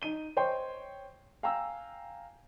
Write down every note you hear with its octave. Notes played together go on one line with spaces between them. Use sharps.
D#4 D#7 G7
C5 C#5 D#5 G5 C6
F5 G5 G#5 A#5 E6